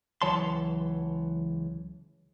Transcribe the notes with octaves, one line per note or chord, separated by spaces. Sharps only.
C#2 E3 F#3 C#5 A5 C6